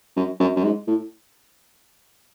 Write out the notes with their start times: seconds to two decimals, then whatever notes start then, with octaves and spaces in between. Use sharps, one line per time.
0.16 F#2
0.40 F#2
0.56 F#2
0.64 G#2
0.87 A2